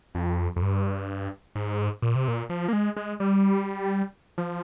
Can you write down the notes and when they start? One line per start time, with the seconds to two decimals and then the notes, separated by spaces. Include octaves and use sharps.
0.15 F2
0.56 F2
0.62 G2
1.56 G#2
2.02 A#2
2.15 C3
2.28 A#2
2.50 F3
2.68 A#3
2.73 G#3
2.96 G#3
3.20 G3
4.38 F3